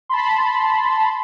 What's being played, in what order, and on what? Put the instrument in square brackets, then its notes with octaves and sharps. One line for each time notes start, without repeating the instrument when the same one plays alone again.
[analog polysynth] A5 B5 C6